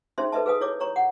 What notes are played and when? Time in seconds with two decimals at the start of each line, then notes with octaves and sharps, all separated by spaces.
0.18 C#4 D#4 G#4 C5 E5 C6
0.32 A4 B4 D#5 E5 A5
0.46 G#4 B4 F5 G#5 D#6
0.61 E4 C#5 D6
0.80 C#5 A#5 C#6
0.96 F#5